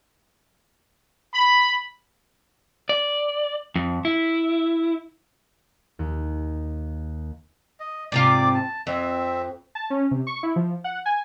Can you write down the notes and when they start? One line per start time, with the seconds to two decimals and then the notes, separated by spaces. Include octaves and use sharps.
1.34 B5
2.89 D5
3.75 F2
4.05 E4
5.99 D#2
7.80 D#5
8.12 G#2 C3 F4 D5 D6
8.54 A5
8.87 F2 C4 E5
9.75 A5
9.90 C#4
10.11 C3
10.27 C#6
10.43 E4
10.56 F3
10.84 F#5
11.06 G#5